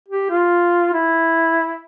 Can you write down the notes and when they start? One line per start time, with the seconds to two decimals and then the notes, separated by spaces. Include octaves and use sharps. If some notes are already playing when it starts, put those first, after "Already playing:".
0.08 G4
0.30 F4
0.94 E4